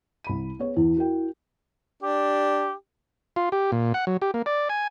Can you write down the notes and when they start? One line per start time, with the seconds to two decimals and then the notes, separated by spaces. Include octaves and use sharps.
0.24 C2 B5 D#7
0.59 B3 G#4 C#5
0.77 E2 E4
0.97 F#4 A#4 G5
2.03 D4 G4
3.36 F4
3.52 G4
3.72 A#2
3.94 F#5
4.07 F#3
4.22 G4
4.34 A#3
4.46 D5
4.69 G#5